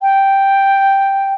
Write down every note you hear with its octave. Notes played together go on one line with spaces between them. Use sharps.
G5